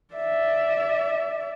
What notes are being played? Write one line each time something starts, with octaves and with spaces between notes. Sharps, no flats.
D5 E5